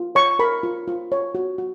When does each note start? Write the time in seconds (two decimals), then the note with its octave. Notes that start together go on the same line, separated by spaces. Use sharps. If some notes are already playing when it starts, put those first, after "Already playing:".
Already playing: F4
0.15 C#5 C#6
0.39 A#4 B5
0.63 F4
0.88 F4
1.12 C#5
1.35 F#4
1.58 F#4